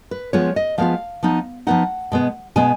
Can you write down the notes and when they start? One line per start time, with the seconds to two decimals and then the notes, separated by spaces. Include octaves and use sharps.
0.11 B4
0.33 F3 G#3 B3 F4 C#5
0.56 D#5
0.78 F3 G#3 B3 F4 F5
1.23 F3 B3 D#4
1.67 F3 B3 D#4 F#5
2.12 B2 G#3 B3
2.56 B2 G#3 B3 G#5